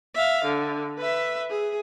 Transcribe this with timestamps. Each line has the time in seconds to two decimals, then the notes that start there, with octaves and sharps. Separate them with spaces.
0.15 E5 F5
0.45 D3
0.98 B4 E5
1.50 G#4